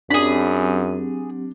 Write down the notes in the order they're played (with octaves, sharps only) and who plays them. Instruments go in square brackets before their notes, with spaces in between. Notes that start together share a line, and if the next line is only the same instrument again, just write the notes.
[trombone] F#2 [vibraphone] F#3 C4 G4 [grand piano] D4 [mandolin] G#4 B5